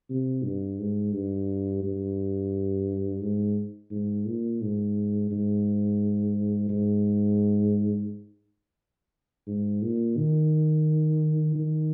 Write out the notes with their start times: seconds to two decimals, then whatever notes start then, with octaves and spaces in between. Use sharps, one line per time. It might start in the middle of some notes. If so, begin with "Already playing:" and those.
0.10 C3
0.44 G2
0.79 G#2
1.14 G2
1.83 G2
3.22 G#2
3.91 G#2
4.27 A#2
4.61 G#2
5.31 G#2
6.69 G#2
9.47 G#2
9.82 A#2
10.16 D#3
11.55 D#3